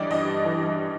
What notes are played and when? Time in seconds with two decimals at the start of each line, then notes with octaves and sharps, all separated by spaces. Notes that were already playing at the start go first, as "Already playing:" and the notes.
Already playing: G2 E3 G3 D5 D#5
0.10 G2 D#5
0.45 E3 G3